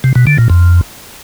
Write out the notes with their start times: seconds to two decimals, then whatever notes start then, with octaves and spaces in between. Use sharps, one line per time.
0.04 C3
0.15 B2
0.27 D3
0.38 A#2
0.50 F2